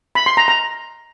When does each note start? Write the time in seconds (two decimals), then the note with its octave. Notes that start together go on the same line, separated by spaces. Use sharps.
0.15 B5
0.26 C6
0.37 A#5
0.48 A#5